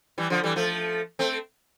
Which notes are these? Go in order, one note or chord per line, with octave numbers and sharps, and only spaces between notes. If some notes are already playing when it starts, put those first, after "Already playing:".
E3 G3
D3 F3
E3 G3
F3 A3
A3 C4